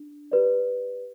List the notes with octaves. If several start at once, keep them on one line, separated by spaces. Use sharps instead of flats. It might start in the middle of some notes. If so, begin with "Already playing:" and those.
Already playing: D4
G4 B4 D5